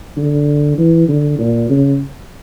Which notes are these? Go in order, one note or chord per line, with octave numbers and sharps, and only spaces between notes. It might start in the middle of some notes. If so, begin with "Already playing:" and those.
D3
E3
D3
A#2
C#3